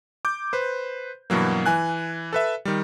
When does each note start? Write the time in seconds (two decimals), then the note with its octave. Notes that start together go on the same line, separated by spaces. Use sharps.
0.25 D6 G6
0.53 B4 C5
1.30 G2 B2 E3 F#3 A#3
1.66 E3 G#5 F#6
2.33 A4 B4 E5
2.65 D#3 G3